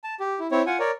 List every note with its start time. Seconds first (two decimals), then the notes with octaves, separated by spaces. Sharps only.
0.04 A5
0.20 G4
0.40 E4
0.51 C4 E4 C#5
0.66 F4 F#5 G#5
0.80 A#4 C#5 D5